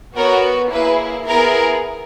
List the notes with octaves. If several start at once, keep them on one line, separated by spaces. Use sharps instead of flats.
B3 F#4 A#4 C#5
A#3 E4 G#4 B4
B3 E4 G#4 A#4